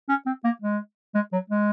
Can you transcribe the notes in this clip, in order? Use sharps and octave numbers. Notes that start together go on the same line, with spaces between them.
C#4
C4
A#3
G#3
G#3
F#3
G#3